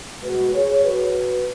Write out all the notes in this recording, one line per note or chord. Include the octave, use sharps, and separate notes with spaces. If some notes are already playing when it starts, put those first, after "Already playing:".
B2 G#3 F#4 B4
G#4 C#5
F#4 B4